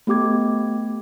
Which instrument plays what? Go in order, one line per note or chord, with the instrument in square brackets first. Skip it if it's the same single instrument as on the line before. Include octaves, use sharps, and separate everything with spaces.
[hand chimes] A3 B3 G4 D6 G#6